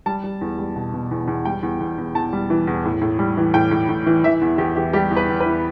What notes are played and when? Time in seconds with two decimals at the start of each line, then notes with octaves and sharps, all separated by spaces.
0.06 G3 A5
0.24 G3
0.41 E2
0.59 G3
0.76 B2
0.94 B2
1.11 E2
1.28 E2
1.45 G3 G5
1.63 E2
1.80 E2
1.98 E2
2.15 E2 A5
2.33 G3
2.50 E3
2.67 E2
2.85 A2
3.02 A2
3.19 G3
3.37 E3
3.54 A2 G5
3.71 A2
3.89 A2
4.06 E3
4.24 E3 E5
4.41 E2
4.58 E2 G4
4.76 E3 G4
4.93 G3 G4
5.11 E2
5.17 B4
5.29 E2
5.40 B4
5.46 E3